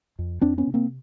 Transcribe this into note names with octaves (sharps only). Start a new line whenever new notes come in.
F2
F2 C4 D4
B3 C#4
C3
A#3 C4